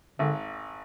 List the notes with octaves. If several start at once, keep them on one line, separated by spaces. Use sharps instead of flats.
G#1 D3